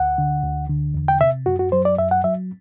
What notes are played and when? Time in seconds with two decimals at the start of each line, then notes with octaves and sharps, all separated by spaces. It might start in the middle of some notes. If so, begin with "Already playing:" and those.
Already playing: D2 F#5
0.18 D3
0.43 D2
0.69 D3
0.94 E2
1.08 G5
1.20 C3 E5
1.46 F#2 F#4
1.59 F#4
1.72 F#3 C5
1.85 D5
1.98 F#2 E5
2.11 F#5
2.24 F#3 E5